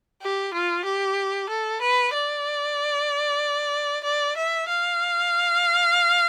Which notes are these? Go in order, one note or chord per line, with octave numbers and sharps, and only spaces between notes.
G4
F4
G4
A4
B4
D5
D5
E5
F5